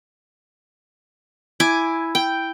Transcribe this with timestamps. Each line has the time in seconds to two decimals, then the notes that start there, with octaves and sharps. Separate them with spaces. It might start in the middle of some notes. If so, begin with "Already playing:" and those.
1.60 E4 G#5 D6
2.15 G5